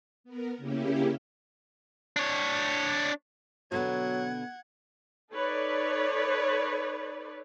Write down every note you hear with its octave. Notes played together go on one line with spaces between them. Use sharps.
B3 A#4
C#3 A#3 C#4 E4 G4
D4 C#5
B2 D3 F#3 B3 F#5 G#6
D#4 A4 B4 C#5 D5